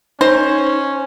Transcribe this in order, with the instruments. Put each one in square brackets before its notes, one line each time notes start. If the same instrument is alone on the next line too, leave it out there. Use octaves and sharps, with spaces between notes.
[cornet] C#4 [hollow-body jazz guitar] D#4 [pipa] C5